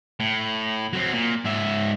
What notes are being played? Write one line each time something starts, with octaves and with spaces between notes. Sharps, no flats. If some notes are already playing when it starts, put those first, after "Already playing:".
A2
F#3 C4
A#2
G#2 E5